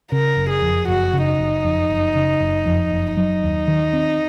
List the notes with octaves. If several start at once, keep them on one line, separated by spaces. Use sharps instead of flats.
C#3 A#4
F#1
G#4
F2
F#1 F#4
C#3
D#4
F#1
F2
F#1
C#3
F#1
F2
F#1
F#3 D#4
D#2
D#3
C4